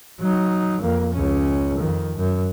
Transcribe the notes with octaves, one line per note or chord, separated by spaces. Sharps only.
F#3 D#4
F2 A#3
C#2 C#4
F2 D#3
F#2